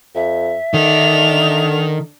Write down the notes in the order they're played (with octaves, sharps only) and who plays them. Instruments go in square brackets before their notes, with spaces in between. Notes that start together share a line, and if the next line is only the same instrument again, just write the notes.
[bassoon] F2 [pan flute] E5
[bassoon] D3 [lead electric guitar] D#3 [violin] D4 F7